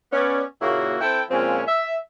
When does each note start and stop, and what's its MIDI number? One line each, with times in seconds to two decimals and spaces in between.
0.12 0.43 59
0.12 0.43 61
0.12 0.43 74
0.62 0.96 46
0.62 0.96 49
0.62 0.96 58
0.62 0.96 64
0.62 0.96 66
1.01 1.22 60
1.01 1.22 64
1.01 1.22 69
1.01 1.22 79
1.30 1.62 46
1.30 1.62 53
1.30 1.62 56
1.30 1.62 60
1.30 1.62 61
1.67 1.96 76